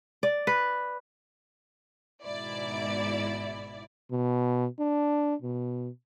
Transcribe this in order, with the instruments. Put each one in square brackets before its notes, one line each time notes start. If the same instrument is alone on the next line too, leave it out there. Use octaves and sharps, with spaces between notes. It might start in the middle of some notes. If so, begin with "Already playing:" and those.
[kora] D5
B4
[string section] G#1 G#2 B2 E4 D5
[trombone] B2
D4
B2